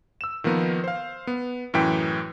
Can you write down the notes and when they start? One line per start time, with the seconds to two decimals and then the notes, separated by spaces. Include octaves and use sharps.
0.21 E6 E7
0.44 D#3 F3 A#3 B3 D#4
0.84 C5 F5
1.27 B3
1.74 F#2 A2 E3 G5 B6